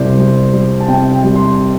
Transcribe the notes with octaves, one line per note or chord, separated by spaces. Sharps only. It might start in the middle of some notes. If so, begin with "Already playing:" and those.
Already playing: C2 G3 C5 D5
G3
G3
A5
C3 G5
G5
G3
C6